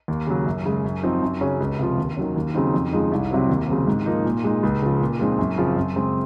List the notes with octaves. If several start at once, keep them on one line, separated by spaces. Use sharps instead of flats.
D#2
C#3 F#3
F#2
C#3 G#3
F#2
F3 C4 D#4
F#2
C#3 F#3 C#4
C#2
C3 F3
D#2
D#3 F#3 C#4
D#2
C#3 F#3 C4 D#4
F2
C#3 F3 G#3 D#4
C2
C3 F#3 C4
D#2
C#3 F#3 C4
G#2
F3 A#3 D#4
A#2
G#3 D#4
C#2
C#3 F3
A#2
F3 G#3 C4 D#4
F#2
C#3 F3 C4
F#2
C#3 G#3 C4